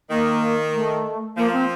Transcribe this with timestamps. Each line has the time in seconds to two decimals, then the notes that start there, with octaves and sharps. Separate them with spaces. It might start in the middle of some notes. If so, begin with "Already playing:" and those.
0.10 D#3 A#3
0.74 A3
1.37 F3 A#3
1.53 C4